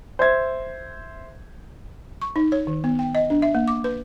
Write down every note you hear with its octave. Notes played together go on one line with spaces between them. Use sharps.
C5 E5 G#6
C#6
D#4
C#5
D#3
B3
G5
D#5
D4
E5
A#3
D6
B4